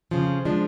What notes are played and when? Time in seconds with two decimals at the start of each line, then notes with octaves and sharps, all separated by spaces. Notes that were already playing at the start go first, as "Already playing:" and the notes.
0.11 F2 C#3 F3
0.45 F3 G#3 D4